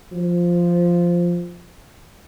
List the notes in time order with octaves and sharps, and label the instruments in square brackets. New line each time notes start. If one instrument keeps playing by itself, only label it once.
[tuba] F3